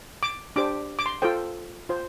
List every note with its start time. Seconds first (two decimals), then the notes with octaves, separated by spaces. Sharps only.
0.23 D6
0.56 D4 G4 C5 D6
0.99 D6
1.06 C6
1.22 F4 A4 C5 G5
1.89 F4 C5